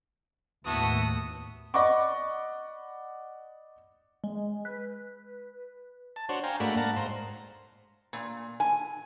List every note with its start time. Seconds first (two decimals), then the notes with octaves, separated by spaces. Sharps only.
0.66 D#2 A2 B3 E4 F#4 A5 D#6
1.74 D5 D#5 F#5 B5 C#6 D6
4.24 G#3
4.65 B4
6.16 A5
6.29 D4 F#4 C5 C#5
6.44 F5 G5 G#5 A#5
6.60 G#2 A3 A#3 D4 F#4 B5
6.77 F5 F#5 A5 A#5
6.96 G#2 C5 A#5
8.13 A#2
8.60 G#5